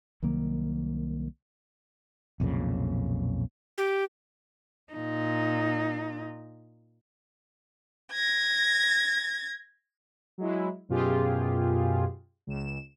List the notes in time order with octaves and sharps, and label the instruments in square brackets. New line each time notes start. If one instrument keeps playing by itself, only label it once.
[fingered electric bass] C2 D#3 F#3 A#3
[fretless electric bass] B1 F2 A#2 C#3
[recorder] G4
[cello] A#2 D#4
[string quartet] G#6 A#6
[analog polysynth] F#3 G#3 E4
F#2 B2 F4 G4 G#4
C#2 E7